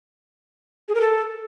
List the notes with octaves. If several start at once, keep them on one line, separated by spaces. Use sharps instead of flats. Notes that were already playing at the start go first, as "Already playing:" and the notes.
G#4
A#4
A4